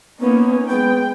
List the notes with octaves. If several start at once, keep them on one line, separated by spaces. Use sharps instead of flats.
A#3 B3 C#4 D#4
G#3 B3 G5